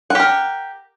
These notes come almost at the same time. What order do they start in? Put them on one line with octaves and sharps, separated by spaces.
F#5 G4 A#4